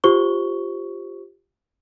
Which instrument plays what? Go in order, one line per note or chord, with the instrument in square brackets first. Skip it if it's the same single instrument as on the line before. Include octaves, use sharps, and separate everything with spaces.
[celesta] F4 G4 C5 C#6 G7